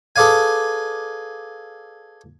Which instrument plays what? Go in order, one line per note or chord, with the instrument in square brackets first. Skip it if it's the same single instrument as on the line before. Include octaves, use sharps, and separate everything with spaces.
[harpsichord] G#4 A4 B4 D5 F5 G#5